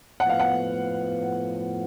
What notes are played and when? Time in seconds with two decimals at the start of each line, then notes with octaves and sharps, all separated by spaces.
0.20 A2 F3 B3 F#5
0.29 F5
0.40 F#5